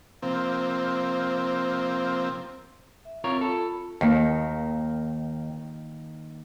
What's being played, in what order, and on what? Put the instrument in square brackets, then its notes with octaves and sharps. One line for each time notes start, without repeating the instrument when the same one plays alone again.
[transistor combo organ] C3 F3 A#3 C4
[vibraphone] E5
[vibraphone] C4 [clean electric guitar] F4 A#4 C#5
[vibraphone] F4 B5 [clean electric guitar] A4
[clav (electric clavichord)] D#2 [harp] D#3 A#3